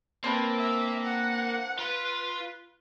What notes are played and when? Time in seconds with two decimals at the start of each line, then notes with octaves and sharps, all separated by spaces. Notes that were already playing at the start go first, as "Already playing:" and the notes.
0.24 A#3 C4 D4 B4
0.57 E5
1.04 F#5
1.79 F4 B4